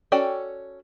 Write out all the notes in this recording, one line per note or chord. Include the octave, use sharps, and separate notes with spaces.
C#4 F#4 A4 D5 G5